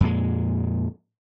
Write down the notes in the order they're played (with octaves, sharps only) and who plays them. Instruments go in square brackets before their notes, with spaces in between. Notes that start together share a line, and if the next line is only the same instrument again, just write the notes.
[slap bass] F2 A#2 G#3